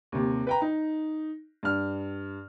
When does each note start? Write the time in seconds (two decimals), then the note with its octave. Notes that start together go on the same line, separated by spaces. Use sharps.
0.12 D#2 C3
0.47 B4 G5 A#5
0.62 D#4
1.63 G2 F6